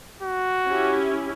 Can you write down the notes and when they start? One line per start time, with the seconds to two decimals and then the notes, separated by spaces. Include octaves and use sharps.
0.22 F#4
0.67 C#4 E4 G4